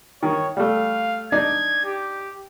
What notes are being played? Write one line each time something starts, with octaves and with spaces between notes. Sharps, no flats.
D#3 C#5
G3 A3 F5
D4 D#4 D5 G#6
G4